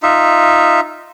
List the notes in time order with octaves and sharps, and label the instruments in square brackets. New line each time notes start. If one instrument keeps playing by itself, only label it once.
[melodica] D#4 F4 E5